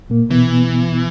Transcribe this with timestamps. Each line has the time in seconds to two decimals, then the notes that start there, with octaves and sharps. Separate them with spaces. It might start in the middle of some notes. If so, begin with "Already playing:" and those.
0.10 A#2 A#3
0.31 B2 E3 B3